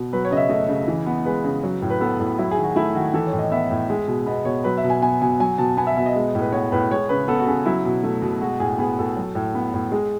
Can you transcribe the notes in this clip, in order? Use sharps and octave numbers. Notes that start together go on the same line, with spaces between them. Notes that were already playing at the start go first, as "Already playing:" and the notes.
Already playing: B2
F#3 B4
C#5
C#3 D#5
E5
A3 D#5
C#3
E3
B3
G#3 B4
C#3
F#3
A2
B4
B3 A4
A2
F#3 E4
G#4
D#3
F#4
A3 E4
D#3 F#4
E3 A4
C#5
A2
D#5
B3 E5
A2
G#3
B2
B3 D#5
B2 C#5
F#3 B4
E5
B2
G#5
B3 G#5
B2 G#5
F#3 G#5
B2 A5
B3 G#5
E5
B2 E5
D#5
G#3
A2
B4
B3 C#5
A2 B4
G#3 C#5
C#3 B4
B3 A4
F#4
C#3 G#4
F#3 E4
B2
A3
B2
G#3 F#4
A2 G#4
B3 G#4
A2 A4
F#3
A2
B3
A2
G#3 G#4